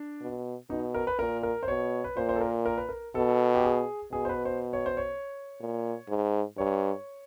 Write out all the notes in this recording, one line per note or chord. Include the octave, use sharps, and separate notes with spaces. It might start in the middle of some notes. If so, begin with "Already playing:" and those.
Already playing: D4
B2
B2 D#4
A#4
B4
A#2 A#4
A#4
C5
B2 C#5
B4
A#2 C5
C5
A4
A#4
A#4
B4
A#4
B2 A4
G4
G#4
B2 G#4
C5
B4
C5
C#5
C5
C#5
A#2
G#2
G2 C#5